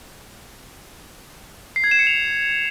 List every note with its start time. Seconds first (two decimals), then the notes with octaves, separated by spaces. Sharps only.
1.76 C7
1.84 G#6
1.91 E7
1.99 C#7
2.07 F7